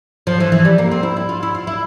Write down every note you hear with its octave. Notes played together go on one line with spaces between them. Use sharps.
F3
E3
E3
G3
A#3
C4
E4
E4
F4
E4
F4
E4